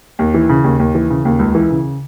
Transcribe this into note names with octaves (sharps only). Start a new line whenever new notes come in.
D#2
E3
C#3
D#2
D#2
E3
C#3
D#2
C#2
E3
C#3